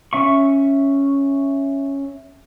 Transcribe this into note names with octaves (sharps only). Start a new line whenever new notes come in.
C#4 E5 C#6